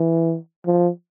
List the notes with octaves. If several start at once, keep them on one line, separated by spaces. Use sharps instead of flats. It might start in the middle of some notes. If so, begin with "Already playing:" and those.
Already playing: E3
F3